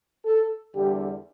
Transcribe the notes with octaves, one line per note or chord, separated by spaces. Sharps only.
A4
E2 D3 G3 G4